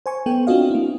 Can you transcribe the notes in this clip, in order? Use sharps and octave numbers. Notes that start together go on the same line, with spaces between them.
C5 G#5 C#6
B3 A4 G5
C4 D4 F4 F#4 D#5 F5
A#3 E4